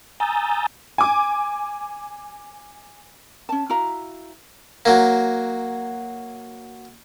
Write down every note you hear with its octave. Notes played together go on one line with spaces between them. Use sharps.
G#5 A#5 D#6 E6 G6 A6
G#5 D6
C#4 A5
E4 F#4 F5 A#5
F#3 A#3